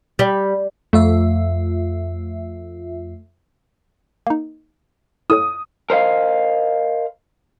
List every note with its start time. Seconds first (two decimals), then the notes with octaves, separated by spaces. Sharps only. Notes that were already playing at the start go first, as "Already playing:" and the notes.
0.19 G3
0.93 F2 A3 F4 E5
4.27 A#3 D#4
5.30 E4 A4 C#5 D#6
5.90 A#4 C5 D#5 F5